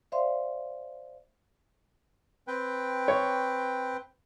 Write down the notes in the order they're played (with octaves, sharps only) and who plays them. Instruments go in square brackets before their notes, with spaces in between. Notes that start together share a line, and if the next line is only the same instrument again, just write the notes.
[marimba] C5 D5 E5 F5 C6
[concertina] C4 B4 G5
[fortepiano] C#5